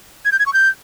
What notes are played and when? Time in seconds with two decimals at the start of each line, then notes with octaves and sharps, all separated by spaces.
0.25 G#6
0.32 G6
0.39 G#6
0.46 C#6
0.53 G6